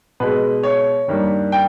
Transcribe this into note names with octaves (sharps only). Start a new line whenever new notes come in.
B2 G#3 B4
C#5
G2 D#3 G3 A#3
G5